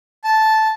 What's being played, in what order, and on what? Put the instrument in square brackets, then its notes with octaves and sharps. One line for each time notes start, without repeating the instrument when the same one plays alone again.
[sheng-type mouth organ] A5